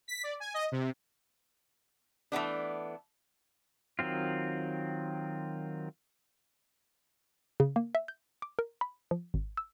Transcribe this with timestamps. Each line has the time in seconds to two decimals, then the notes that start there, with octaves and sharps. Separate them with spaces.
0.08 B6
0.23 D5
0.40 G#5
0.54 D#5
0.72 C3
2.32 E3 A3 B3 D4
3.99 D#3 F#3 C4 F4
7.60 C#3
7.76 A#3
7.95 E5
8.08 G6
8.42 D6
8.59 A#4
8.81 B5
9.11 F3
9.34 G#1
9.57 E6